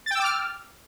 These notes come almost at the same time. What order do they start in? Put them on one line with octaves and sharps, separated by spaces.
A6 G5 E6 D6 F6